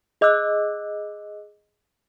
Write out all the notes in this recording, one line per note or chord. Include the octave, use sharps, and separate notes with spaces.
G#4 D#5 D6 E6 F#6